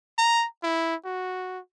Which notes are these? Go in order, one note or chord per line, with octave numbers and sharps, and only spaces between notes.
A#5
E4
F#4